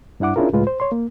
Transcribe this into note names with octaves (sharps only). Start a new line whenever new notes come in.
G2 D4 E4 F#5 D6
C#4 D4 E4 F4 G#4 A#4
C#2 A2 G#3 F4 B4
C5
C#5 C6
A#3